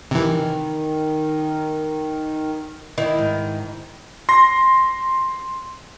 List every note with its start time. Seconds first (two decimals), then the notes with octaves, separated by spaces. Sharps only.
0.11 C3 D#3 E3
2.98 D#3 E4
3.18 G#2
4.29 C6 A#6